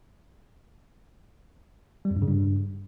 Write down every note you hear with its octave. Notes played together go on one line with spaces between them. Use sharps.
G3
F2
G2
C#3
G2